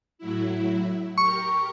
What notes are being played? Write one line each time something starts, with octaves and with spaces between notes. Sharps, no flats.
A2 F#3 E4
G4 A#4 C#6